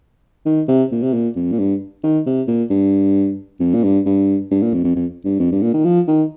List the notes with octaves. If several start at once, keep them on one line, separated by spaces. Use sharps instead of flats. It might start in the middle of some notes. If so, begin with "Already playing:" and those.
D#3
C3
A#2
C3
A#2
F2
A#2
G2
D#3
C3
A#2
G2
F2
A#2
G2
G2
G2
A#2
F2
F2
F2
G2
F2
G2
A#2
D#3
F3
D#3